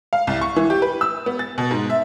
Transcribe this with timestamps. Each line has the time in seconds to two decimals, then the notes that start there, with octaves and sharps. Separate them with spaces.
0.13 F5
0.27 C2
0.41 C#6
0.56 E3
0.70 G4
0.82 B4
1.01 E6
1.26 B3
1.39 A6
1.58 B2
1.71 G#2
1.90 E5